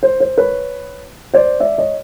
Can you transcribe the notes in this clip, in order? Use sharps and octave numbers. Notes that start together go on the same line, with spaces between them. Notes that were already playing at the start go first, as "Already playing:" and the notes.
C5
C5
B4 C#5
C5 D5
D5 E5
C#5 D#5